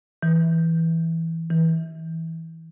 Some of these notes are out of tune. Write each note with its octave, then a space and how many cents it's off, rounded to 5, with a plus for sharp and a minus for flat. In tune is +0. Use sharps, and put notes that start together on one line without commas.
E3 -5
E3 -20